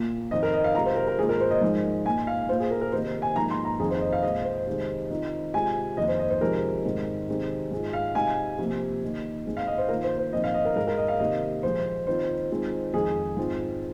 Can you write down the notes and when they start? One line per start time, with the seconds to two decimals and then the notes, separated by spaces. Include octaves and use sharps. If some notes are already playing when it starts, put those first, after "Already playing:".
Already playing: A#2 A#3 F4
0.31 F2 D#3 C4 D#4 D#5
0.43 A#4
0.53 D#5
0.64 F5
0.75 C3 G#3 F4 A#5
0.86 C5
0.96 A#4
1.07 A#4
1.18 G#2 D#3 A#3 F4 G#4
1.29 A#4
1.41 C5
1.51 D#5
1.61 G#2 F3 G#3 D#4
2.05 A#2 A#3 D#4 G#5
2.27 F5
2.49 A#2 A#3 F4 C5
2.60 G#4
2.71 A#4
2.81 A#4
2.92 C3 D#3 A#3 D#4 C5
3.22 G#5
3.36 G#2 F3 A#3 D#4 A#5
3.51 C6
3.65 A#5
3.80 F2 D#3 C4 G#4
3.90 C5
4.01 D#5
4.13 F5
4.23 A#2 G#3 C4 D#5
4.45 C5
4.67 C3 D#3 G#3
5.10 D#3 C4 F4
5.54 C3 G#3 F4 G#5
5.97 F2 D#3 A#3 D#4 D#5
6.08 C5
6.19 D#5
6.30 C5
6.41 C3 F3 G#3 D#4 A#4
6.84 G#2 D#3 C4
7.28 C3 D#3 G#3 C4 D#4
7.71 G#2 G#3 F4
7.93 F5
8.15 C3 G#3 D#4 G#5
8.58 C3 F3 A#3
9.02 D#3 A#3 D#4
9.45 G#2 G#3 C4
9.57 F5
9.67 D#5
9.78 C5
9.89 D#3 A#3 F4 A#4
10.04 C5
10.18 C5
10.33 A#2 F3 C4 D#4 D#5
10.44 F5
10.54 D#5
10.65 A#4
10.76 G#2 G#3 D#4 A#4
10.87 A#4
10.98 D#5
11.08 F5
11.19 C3 D#3 A#3 D#5
11.63 A#2 F3 G#3 C5
12.06 D#3 C4 F4 C5
12.51 D#3 G#3 C4 F4
12.94 F2 D#3 G#3 D#4 G#4
13.37 G#2 G#3 C4 F4